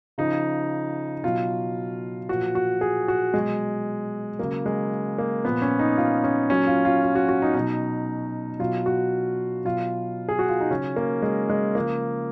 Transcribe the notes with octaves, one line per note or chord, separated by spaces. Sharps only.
C#3 F3 D#4
B2 F#3 F4
A#2 F3 F#4
F#4
G#4
F#4
B2 F#3 G#3
C#3 F#3 A#3
G#3
A#3
A#2 F3 B3
C#4
D#4
F4
C#4
A#2 F#3 C#4
F4
F4
F4
F#4
F#4
D#4
B2 D#4
F#3
B2 F#3 F4
F#4
B2 F#3 F4
G#4
F#4
F4
D#4
C#3 F#3 C#4
A#3
G#3
G#3
C#3 F3 A#3